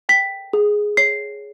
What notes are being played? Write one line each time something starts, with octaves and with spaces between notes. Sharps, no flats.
G5 B6
G#4
C#5 C7